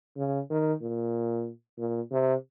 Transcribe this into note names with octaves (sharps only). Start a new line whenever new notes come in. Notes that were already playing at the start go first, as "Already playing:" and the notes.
C#3
D#3
A#2
A#2
C3